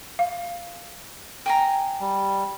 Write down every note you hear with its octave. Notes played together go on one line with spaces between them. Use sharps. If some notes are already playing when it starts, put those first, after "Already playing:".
F5
G5 G#5 A#5
G3